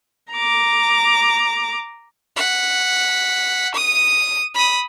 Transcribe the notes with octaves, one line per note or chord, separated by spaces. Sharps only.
A#5 D6
F#5 B6
D#6 D#7
B5 D#6